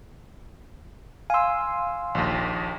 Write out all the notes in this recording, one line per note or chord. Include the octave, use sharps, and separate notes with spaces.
F5 G#5 C6 E6
A#1 D#2